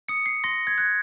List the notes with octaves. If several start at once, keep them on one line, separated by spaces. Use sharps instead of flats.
D#6 C#7
C7
C6 A#6
G#6
F#6 G#6